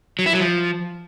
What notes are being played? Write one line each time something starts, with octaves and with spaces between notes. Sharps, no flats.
F#3
E4
F#3
F3